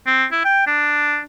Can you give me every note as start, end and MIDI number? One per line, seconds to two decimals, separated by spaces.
0.06 0.25 60
0.32 0.45 64
0.45 0.64 79
0.67 1.21 62